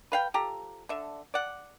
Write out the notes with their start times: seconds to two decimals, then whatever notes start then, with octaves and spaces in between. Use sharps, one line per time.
0.12 B4 F5 G5
0.34 F3 G4 A4 A#5
0.89 D3 E5
1.34 D5 F#5